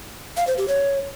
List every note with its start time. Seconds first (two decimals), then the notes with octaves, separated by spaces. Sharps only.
0.37 F5
0.47 C5
0.58 G4
0.68 C#5